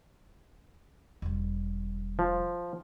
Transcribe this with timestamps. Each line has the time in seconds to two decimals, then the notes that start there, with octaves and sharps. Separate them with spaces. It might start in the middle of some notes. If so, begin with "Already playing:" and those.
1.22 E1 G3
2.19 F3